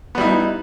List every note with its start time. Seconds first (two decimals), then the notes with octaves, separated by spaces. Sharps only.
0.15 B3
0.18 G3
0.21 E4
0.24 D#4